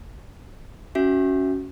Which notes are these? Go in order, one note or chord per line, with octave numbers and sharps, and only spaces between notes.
C#4 F#4 E5